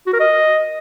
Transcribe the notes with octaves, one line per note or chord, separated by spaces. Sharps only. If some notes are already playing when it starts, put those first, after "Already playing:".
F#4
A#4
D#5